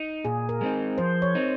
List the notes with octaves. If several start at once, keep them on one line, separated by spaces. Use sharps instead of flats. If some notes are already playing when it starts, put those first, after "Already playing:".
Already playing: D#4
A#2 G#4
A#4
G#3 C4 D#4
F3 C5
C#5
C4 D#4